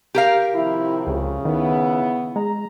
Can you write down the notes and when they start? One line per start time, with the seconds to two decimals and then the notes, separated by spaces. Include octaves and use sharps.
0.15 G4 A#4 F5
0.55 C3 D#3 F3 E4
1.07 C#2 C#3
1.45 D#3 B3 E4
2.36 G#3 A#5